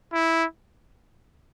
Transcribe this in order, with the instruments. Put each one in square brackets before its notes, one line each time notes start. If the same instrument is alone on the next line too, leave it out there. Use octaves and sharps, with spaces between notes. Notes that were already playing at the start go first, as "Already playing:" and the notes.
[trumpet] E4